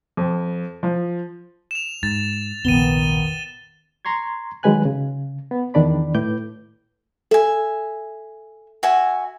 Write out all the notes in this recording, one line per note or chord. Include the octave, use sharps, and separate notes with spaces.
F2
F3
E7 F7
G#2 A6
F1 A#1 D#3 B3 D#7 G7
A#5 C6 C#6 G#6
D#3 F#3 G#3 B4 G#5 F#6
C#3
B3
E2 D#3 D4 D5 B5
A2 B4 D6 G6
A4 E5 G#5
F#4 E5 G#5